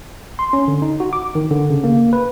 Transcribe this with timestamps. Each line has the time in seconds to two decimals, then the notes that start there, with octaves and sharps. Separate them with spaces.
0.39 C6
0.53 C#4
0.68 D3
0.82 D#4
1.00 F#4
1.13 D6
1.35 D#3
1.51 D3
1.70 C#3
1.84 A#3
2.13 B4